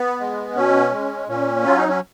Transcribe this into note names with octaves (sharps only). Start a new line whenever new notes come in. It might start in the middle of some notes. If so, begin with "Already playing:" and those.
Already playing: B3
G#3
B2 C#4
G#3
A#2 C#4
F#3 F4
D#4
C#4